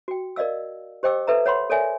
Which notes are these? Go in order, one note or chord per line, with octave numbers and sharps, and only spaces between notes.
F#4 G5
A#4 D5 D#5 F5 E6
G4 C5 D#5 G5 D6 E6
A4 B4 E5 A#5
C#5 F#5 B5 C6
A4 A#4 C#5 D5 E5 G#5